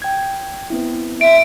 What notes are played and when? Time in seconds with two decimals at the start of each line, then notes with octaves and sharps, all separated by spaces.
0.02 G5 G#6
0.70 B3 C4 E4
1.21 E5 D7